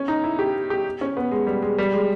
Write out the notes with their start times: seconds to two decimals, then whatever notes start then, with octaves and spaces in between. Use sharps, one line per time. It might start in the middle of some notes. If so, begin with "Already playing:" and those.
Already playing: C#4
0.08 D#4
0.24 E4
0.39 G4
0.70 G4
1.01 C#4
1.17 B3
1.31 G#3
1.47 G3
1.62 G#3
1.78 G3
1.93 G#3